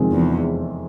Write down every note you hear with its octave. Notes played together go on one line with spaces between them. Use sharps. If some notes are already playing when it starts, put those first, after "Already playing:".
Already playing: F2 C3 D#3 G#3 C4
E2